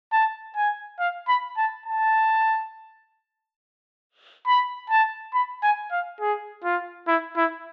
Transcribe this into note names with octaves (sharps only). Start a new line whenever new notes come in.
A5
G#5
F5
B5
A5
A5
B5
A5
B5
G#5
F5
G#4
F4
E4
E4